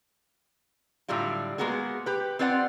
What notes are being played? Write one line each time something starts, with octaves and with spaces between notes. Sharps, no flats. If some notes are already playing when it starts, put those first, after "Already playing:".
A2 D3 F#3 G3 F4
G#3 A#3 B3 F#4 G#4
G4 B4
C4 F4 B4 D5 E5 F#5